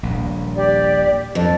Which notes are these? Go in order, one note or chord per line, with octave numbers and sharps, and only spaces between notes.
D#1 A#1
G4 D5
F2 A4